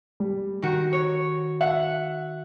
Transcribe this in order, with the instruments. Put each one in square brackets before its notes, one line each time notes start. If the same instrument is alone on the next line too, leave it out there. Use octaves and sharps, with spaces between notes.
[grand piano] G3
[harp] D#3 F#4
C#5
[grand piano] E5 [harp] F#5